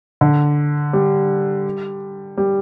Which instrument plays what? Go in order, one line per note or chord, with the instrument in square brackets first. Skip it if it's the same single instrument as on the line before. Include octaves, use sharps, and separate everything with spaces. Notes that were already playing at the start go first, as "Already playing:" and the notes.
[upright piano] D3
G3
G3